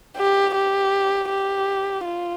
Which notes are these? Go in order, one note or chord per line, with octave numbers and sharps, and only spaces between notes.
G4
G4
G4
F4